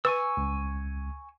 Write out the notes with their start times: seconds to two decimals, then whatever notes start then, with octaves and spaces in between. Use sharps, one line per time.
0.05 B4 G#5 C#6 E6
0.37 C#2